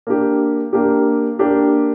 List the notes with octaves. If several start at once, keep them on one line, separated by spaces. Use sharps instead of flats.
A#3 D4 G4
A#3 D4 G4
A#3 D4 G4